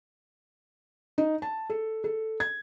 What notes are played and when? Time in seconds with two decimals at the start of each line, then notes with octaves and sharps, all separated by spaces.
1.18 D#4
1.42 A5
1.70 A4
2.04 A4
2.40 G#6